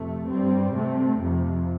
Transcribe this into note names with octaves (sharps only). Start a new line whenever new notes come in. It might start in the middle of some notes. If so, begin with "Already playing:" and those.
Already playing: F2 C3 A3
G2 G3 C4
C3 A3 C4
F2 C3 F3